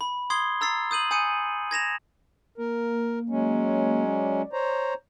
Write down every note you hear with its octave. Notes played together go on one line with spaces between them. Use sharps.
B5
C6 D#6 G#6 C7 G7
A#5 E6 A6 C7
D#6 G6 D#7 F#7
G#5 D#6 G6 C#7 D#7
G#6 A#6 E7 F7
A#3 A#4
F#3 G#3 C#4
D5
C5 C#5 A#5